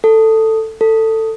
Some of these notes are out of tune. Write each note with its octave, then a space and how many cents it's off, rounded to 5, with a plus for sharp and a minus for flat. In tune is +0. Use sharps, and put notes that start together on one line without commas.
A4 +10
A4 +15